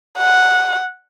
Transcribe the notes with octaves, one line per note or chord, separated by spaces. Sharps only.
F#5